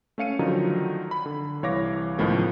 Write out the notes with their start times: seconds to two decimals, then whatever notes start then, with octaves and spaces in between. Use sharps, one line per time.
0.18 A3 C#4 F5 C#7 D#7
0.39 D3 D#3 F3 F#3 D#4
1.11 B5
1.26 D3
1.63 C2 E3 C#5 F5 D6 A#6
2.17 C#2 A2 D#3 F3 A3 B3